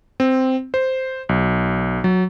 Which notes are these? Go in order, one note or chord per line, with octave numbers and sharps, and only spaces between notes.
C4
C5
B1
F#3